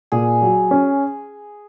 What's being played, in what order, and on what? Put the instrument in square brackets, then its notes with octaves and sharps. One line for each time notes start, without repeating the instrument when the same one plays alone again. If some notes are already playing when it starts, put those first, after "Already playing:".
[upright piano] A#2 [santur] G#4
[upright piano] F#3
C#4